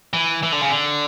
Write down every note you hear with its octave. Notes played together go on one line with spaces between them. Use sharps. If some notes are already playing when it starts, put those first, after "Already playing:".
E3
E3
D3
C#3
D3